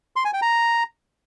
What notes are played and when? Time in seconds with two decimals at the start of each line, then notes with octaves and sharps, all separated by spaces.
0.16 C6
0.25 G#5
0.33 G5
0.42 A#5